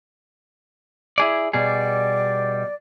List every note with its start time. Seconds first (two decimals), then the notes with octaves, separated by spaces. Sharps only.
1.18 E4 G#4 D5
1.53 B2 G3 G#4 D5